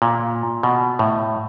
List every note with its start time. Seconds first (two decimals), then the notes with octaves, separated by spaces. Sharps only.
0.02 A#2
0.63 B2
0.99 A2